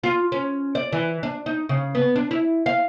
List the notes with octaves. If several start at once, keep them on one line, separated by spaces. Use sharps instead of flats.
F4
C#4
D5
E3
D4
D#4
C#3
B3
D4
E4
F5